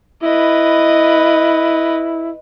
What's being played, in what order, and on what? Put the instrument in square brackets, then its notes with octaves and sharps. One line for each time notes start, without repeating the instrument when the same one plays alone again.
[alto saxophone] E4 [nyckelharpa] B4 D#5